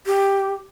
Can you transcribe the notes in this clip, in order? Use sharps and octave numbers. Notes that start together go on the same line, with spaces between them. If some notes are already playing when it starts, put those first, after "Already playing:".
G4